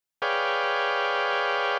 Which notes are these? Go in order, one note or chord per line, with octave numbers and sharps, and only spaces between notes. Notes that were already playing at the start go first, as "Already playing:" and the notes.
G#4 B4 C#5 D5 F5 G5